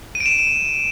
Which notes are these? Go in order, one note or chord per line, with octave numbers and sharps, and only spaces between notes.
D#7
D7
E7